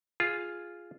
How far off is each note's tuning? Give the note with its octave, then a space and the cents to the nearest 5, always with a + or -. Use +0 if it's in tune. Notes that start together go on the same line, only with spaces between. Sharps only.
F4 +0 G#4 +0